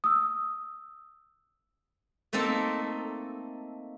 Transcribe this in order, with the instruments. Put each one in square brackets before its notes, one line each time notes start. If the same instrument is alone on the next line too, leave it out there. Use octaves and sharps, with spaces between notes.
[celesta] D#6 E6
[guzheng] A3 A#3 C4 D#4 A4